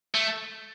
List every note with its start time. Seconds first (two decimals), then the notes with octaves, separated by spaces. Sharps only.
0.15 A3